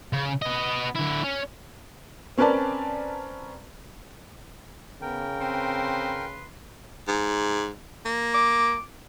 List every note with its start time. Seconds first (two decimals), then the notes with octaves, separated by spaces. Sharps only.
0.13 C#3
0.42 B3 D#5
0.95 D3 E4
1.24 C#4
2.38 C4 C#4 A#4 B4 D5 A5
5.02 C#3 B3 A#4 G5
5.40 C4 B4 C6
7.08 G#2
8.05 A#3
8.34 D6